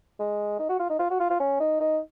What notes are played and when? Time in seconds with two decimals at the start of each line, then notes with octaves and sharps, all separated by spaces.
0.20 G#3
0.59 D#4
0.69 F#4
0.79 F4
0.90 D#4
0.99 F4
1.10 F#4
1.20 F4
1.30 F4
1.40 C#4
1.60 D#4
1.80 D#4